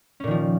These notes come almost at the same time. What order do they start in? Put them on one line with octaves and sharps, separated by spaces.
C#4 A#2 D#3 F3